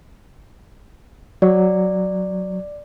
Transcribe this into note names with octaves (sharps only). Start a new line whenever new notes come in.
F#3 D5